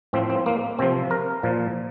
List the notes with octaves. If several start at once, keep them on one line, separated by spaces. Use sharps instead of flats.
A2 F3 C4
C4
A#3
C3 F3 C4
A#4
A#2 F3